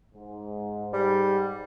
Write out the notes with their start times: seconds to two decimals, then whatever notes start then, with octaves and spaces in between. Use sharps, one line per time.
0.14 G#2
0.93 G3